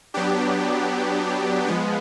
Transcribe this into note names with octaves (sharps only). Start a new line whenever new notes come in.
F#3 B3 D4 G4
F3 G#3 B3